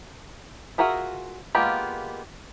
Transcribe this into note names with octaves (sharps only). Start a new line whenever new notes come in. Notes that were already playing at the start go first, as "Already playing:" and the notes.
F4 F#4 G#4 A#4 E5
G#3 A#3 B3 F4 G4